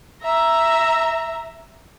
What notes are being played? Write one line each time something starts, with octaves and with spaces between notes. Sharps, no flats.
E5 A#5